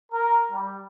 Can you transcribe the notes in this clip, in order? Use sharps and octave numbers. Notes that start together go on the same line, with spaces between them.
A#4
G3